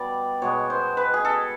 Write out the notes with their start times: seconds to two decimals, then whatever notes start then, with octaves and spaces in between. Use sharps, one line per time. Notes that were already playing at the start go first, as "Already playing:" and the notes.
Already playing: B2 G3 B3 D5
0.42 B2 G#3 B3 C#5
0.70 C5
0.97 B4
1.14 G#4
1.25 A4